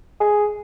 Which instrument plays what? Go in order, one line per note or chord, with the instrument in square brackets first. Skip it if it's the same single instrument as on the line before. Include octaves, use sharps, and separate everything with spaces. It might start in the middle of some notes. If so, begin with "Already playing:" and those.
[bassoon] G#4